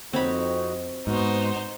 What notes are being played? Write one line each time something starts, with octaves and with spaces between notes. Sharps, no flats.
F2 C4 D#4 F#4 C#5 B5
G#2 B3 D#4 F#4 C5